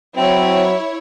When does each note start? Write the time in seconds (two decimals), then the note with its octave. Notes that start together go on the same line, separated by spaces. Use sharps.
0.16 F#3 C4 E4 C#5